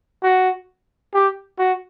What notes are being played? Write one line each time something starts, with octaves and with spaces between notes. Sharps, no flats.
F#4
G4
F#4